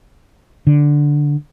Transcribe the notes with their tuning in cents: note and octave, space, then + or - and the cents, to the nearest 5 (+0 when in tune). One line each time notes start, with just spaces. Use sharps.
D3 +0